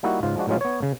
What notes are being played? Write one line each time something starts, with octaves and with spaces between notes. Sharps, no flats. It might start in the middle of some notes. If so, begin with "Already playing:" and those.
G3 A#3 D#4 E4 F#4
G#2 C#3 F4
F3 G#3 D4 F#4
A2 F#3 G#3 C#4 F4
B3 C#5
C#3